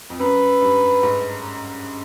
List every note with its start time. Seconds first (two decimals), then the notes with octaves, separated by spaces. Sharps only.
0.10 F2
0.19 F#2 B4
0.61 G2
1.03 G#2